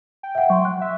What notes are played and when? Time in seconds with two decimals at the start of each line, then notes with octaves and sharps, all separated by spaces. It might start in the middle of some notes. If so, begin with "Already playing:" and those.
0.23 G5
0.35 E5 F#5
0.50 F#3 C6 C#6
0.65 F#6
0.81 E5